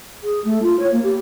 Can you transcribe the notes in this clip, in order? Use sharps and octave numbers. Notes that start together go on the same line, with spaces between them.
G#4
A3
F4
C#5
A#3
G4